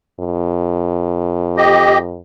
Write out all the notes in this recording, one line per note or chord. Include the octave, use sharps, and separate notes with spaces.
F2
G4 D#5